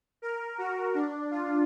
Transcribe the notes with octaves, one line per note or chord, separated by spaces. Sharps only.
A#4
F#4
D4
F4